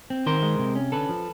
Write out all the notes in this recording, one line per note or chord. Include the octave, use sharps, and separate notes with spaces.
C4
D#3 A#4 C5
G#3
C3
C#4
D3 A4 B4
F3